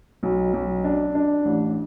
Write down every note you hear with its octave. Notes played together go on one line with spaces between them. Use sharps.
B1
B1
D4
D4
A1